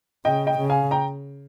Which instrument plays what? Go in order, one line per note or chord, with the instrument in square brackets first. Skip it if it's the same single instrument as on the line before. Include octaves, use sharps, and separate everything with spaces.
[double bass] C#3 [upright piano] D#5 G5
[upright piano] D#5 G5
[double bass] C#3
[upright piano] F5 G#5
G5 A#5